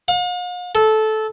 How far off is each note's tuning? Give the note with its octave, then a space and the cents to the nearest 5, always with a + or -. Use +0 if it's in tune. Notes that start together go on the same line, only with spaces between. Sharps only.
F5 +45
A4 -15